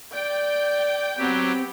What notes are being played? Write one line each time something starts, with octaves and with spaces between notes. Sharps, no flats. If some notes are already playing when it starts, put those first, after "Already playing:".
D5 G5
F#3 B3 C4 G4